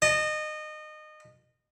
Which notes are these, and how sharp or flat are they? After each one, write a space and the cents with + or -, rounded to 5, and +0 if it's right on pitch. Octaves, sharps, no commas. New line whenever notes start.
D#5 -25 A5 +0